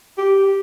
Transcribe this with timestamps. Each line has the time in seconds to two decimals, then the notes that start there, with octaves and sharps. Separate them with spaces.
0.18 G4